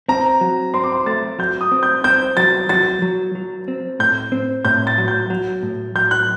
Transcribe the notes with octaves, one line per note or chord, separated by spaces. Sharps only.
C4 A#5
F#3
C4 C6
D6
C6
A3 A6
F#3 G6
D#6
C4
G6
C4 G6
F#3 A6
F#3 A6
F#3
F#3
C4
A2 G6
C4
A2 G6
A6
F#3
G6
F#3
A2
F#3 G6
F#6